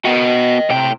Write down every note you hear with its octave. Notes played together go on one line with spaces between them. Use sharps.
B3 F#4 D#5 G5
A2 C3 G5